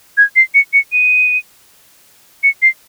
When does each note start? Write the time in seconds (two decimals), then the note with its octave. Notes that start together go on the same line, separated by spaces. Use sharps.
0.17 G#6
0.36 C7
0.55 C#7
0.73 C#7
0.92 D#7
2.43 C#7
2.62 C7